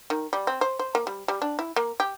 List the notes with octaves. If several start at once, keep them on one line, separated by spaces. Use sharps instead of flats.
D#3
G3
C4
C5
C5
A#3
G3
G3
D4
E4
A#3
G4